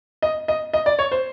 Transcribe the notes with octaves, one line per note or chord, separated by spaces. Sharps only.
D#5
D#5
D#5
D5
C#5
C5